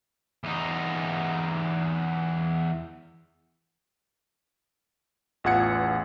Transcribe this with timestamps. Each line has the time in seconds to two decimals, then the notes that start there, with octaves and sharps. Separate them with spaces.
0.44 E2 D#4
5.44 A1 E2 F4 F#5 G#6 C#7